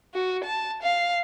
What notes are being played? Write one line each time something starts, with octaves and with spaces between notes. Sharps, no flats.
F#4
A5
F5